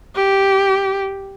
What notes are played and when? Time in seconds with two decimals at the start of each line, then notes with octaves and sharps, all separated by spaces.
0.16 G4